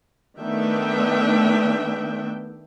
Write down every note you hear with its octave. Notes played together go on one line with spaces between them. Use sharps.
D#3 A3 B3 D4 E5 G5